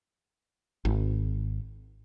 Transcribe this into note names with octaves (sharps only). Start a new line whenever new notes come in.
G#1